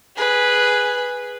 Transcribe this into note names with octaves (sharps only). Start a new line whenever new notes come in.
G#4 B4